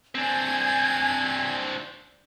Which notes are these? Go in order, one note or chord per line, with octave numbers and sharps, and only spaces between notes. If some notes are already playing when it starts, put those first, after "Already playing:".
C4 D4 G#5 G#6